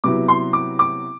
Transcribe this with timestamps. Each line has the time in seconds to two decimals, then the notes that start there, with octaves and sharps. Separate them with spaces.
0.04 C3 F#3 B3 E4 D6
0.28 C6
0.53 D6
0.79 D6